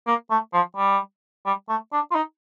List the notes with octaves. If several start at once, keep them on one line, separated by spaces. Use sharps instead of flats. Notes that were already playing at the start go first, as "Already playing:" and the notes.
A#3
A3
F3
G3
G3
A3
D4
F4
D#4